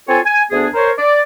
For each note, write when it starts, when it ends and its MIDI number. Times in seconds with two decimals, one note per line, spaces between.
0.08 0.20 60
0.08 0.20 65
0.08 0.20 69
0.08 0.20 73
0.08 0.20 80
0.26 0.43 80
0.51 0.68 38
0.51 0.68 59
0.51 0.68 62
0.51 0.68 68
0.75 0.92 70
0.75 0.92 72
0.75 0.92 73
0.99 1.20 74